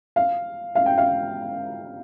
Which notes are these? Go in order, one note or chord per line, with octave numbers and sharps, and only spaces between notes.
F5
F5
G5
F5